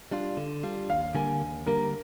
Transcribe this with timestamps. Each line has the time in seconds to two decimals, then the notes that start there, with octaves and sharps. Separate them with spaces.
0.11 G3 D4 F4
0.37 D3
0.63 G3 D4 F4
0.89 D#2 F5
1.15 D3 G3 A#3 G#5
1.41 D#2
1.66 D3 G3 A#3 A#4